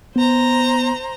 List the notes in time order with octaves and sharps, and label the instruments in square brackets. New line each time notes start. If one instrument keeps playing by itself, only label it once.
[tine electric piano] B3 [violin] C5 A#5